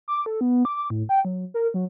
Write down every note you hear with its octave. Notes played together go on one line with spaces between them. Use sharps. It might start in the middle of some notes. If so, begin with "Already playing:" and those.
D6
A4
B3
D6
A2
G5
F#3
A#4
F#3